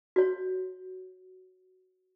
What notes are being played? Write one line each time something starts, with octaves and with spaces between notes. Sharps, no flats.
F#4 C#5